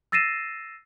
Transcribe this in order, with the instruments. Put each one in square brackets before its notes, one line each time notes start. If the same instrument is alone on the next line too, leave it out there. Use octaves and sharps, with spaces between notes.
[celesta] E6 A6 A#6 C7 D#7 E7